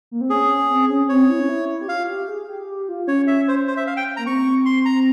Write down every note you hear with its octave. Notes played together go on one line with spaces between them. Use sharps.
A#3
C4
C#4 G#4
C4
C#4
C4 C#5
E4
C#4
E4
G4
F4 F5
G4
G#4
G4
G4
F4
C#4 C#5
E5
C5
C5
E5
F5
G5
A#3 A#5
C4 C#6
C6
A#5